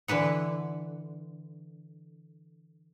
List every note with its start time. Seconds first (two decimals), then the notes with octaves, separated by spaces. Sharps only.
0.08 D3 E3 B4 F#5